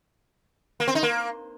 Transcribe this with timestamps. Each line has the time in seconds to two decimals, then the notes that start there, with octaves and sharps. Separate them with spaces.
0.80 A#3
0.88 C4
0.95 D#4
1.03 A#3